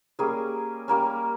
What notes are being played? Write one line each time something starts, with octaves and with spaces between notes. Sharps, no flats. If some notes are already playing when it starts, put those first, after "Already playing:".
G3 A#3 C#4 G#4
G3 A#3 C#4